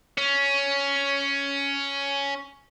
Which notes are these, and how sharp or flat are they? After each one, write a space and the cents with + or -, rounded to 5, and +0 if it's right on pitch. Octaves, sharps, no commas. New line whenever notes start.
C#4 +10